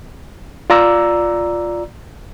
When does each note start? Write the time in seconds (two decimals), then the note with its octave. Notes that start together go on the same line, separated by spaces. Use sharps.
0.70 F4 D5 A#5 E6